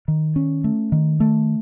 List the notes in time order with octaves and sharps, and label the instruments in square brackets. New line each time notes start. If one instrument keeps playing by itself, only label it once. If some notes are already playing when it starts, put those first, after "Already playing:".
[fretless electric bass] D#3
C#4
A3
D#3
A3